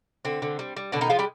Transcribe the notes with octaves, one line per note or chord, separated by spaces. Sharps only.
D3 C4
D3
G3
G3
B2 D3 D4
D#3 D#4
F3 G#3 F4
G3 G4